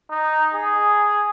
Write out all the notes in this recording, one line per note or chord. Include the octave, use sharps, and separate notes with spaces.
D#4
G#4